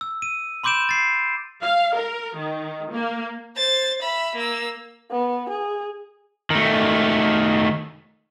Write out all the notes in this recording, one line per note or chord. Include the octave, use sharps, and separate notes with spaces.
E6
D#7
B5 C6 D6 G6 D7 E7
A6 C7
F5
A#4
D#3
A#3
C5 A6
E5 B5
A#3 E6
B3
G#4
D#3 A3